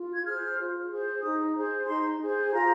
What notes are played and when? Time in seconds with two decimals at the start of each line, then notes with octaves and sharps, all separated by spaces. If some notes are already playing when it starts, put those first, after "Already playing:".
Already playing: F4
0.13 G#6
0.26 G#4 C5 F6
0.58 F4
0.91 G#4 C5
1.23 D#4 D#6
1.56 G#4 C5
1.87 D#4 C6
2.20 G#4 C5
2.52 F4 A#5